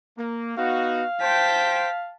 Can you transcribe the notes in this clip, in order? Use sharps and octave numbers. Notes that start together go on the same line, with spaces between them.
A#3
B3 D#4 F#4 F5
C5 G5 A5 B6